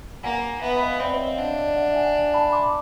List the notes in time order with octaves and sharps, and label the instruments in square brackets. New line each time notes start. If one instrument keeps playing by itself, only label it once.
[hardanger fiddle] A#3 [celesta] F#5 G#5
[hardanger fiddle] B3 [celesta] E5 F#5
[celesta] D#5 F5
[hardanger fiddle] C4 [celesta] D5 E5
[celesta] C#5 D#5
D#5 F5
[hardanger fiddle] D4 [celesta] E5 F#5
[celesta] E5 F#5
F#5 G#5
A5 B5
C6 D6